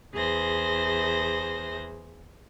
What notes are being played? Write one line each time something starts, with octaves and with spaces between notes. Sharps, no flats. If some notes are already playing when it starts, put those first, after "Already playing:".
E2 G#4 C5 A#6